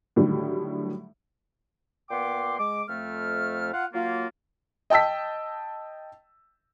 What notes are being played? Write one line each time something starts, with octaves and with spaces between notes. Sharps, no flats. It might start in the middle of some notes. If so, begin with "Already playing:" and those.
A2 D3 D#3 F#3 G3
A#2 B3 G5 C6 D6
G#3 D6
F2 A3 F6
F4 F5 F#5
F#3 A#3 F4
D#5 G5 A5 E6 B6